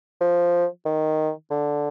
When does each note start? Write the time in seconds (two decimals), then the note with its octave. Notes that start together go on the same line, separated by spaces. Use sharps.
0.21 F3
0.86 D#3
1.50 D3